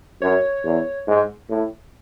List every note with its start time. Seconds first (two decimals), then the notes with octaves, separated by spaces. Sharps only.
0.21 F#2 C#5
0.64 E2
1.07 G#2
1.49 A2